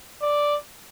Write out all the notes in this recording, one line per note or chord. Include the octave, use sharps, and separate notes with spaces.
D5